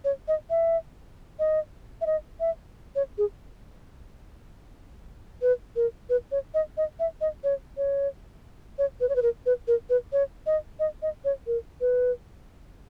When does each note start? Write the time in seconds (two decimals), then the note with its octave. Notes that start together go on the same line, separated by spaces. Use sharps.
0.04 C#5
0.28 D#5
0.50 E5
1.39 D#5
2.01 E5
2.06 D#5
2.40 E5
2.95 C#5
3.18 G#4
5.42 B4
5.76 A#4
6.09 B4
6.31 C#5
6.54 D#5
6.77 D#5
6.99 E5
7.21 D#5
7.44 C#5
7.77 C#5
8.78 C#5
9.00 B4
9.09 C#5
9.16 B4
9.22 A#4
9.46 B4
9.67 A#4
9.89 B4
10.12 C#5
10.46 D#5
10.79 D#5
11.02 D#5
11.25 C#5
11.47 A#4
11.81 B4